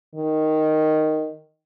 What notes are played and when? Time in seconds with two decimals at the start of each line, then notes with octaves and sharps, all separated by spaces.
0.15 D#3